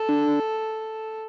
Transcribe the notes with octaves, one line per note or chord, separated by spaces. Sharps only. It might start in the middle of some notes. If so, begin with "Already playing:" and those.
Already playing: A4
D4